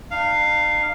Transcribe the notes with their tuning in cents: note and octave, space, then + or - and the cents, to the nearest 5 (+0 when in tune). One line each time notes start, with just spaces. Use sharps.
D4 +45 F5 +0